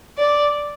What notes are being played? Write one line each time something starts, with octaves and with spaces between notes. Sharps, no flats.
D5